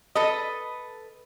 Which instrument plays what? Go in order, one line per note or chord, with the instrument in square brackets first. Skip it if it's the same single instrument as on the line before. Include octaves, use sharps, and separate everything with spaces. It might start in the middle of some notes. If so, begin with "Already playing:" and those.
[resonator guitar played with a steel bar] A4 B4 D#5